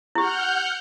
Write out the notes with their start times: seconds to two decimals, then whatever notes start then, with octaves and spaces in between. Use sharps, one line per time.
0.15 E4 G4 F#5 F6 G6